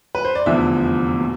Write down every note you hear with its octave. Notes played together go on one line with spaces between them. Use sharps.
B4
C5
D5
F1 E2 D3 F3 E5
B2